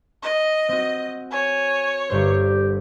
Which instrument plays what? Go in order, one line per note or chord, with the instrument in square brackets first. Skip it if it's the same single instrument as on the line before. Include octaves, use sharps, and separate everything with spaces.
[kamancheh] D#5
[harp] C4 F#4
[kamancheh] C#5 [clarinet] G#5
[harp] G1 G2 C5 [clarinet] G4